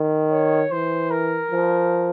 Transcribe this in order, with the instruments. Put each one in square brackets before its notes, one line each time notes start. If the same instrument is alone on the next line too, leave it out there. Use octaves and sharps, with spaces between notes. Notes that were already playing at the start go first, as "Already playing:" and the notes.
Already playing: [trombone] D#3
[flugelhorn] C#5
[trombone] E3 [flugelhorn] C5
[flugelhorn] A#4
[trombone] F3